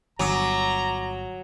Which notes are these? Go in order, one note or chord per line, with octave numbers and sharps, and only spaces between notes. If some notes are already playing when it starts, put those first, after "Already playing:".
G1 F#3 G#5 A#5 D6 D#6